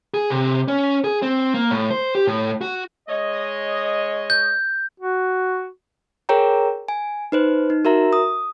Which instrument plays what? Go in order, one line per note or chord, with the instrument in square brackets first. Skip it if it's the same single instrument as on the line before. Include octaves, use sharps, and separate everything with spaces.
[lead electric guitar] G#4
C3
C#4
G#4
C4
A#3
A2
C5
G4
A2
F#4
[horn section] G#3 C#5 D#5
[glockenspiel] G6
[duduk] F#4
[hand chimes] G#4 A#4 C#5 G5 A#5
G#5
D#4 B4 C5
D#4
F#4 A#4 E5 A#5
D#6